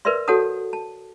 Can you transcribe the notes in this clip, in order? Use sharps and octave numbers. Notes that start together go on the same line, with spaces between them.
A#4 B4 D5 E5 C6
F#4 A4 C#5 F#5 A5 D#6
A5